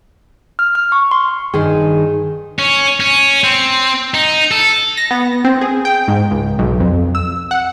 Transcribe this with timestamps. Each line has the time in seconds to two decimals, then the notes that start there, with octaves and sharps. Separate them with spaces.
0.59 F6
0.75 F6
0.92 C#6
1.11 C6
1.54 G2 D#3 G#4
2.59 C#4
3.00 C#4
3.44 C4
4.14 D#4
4.51 A4
4.97 A#6
5.11 B3
5.45 C4
5.61 G#4
5.85 G5
6.08 G#2
6.31 C#2
6.59 B1
6.80 F2
7.15 E6
7.51 F#5